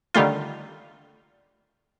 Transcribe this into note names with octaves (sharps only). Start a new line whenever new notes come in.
D3 D#3 G3 A3 F4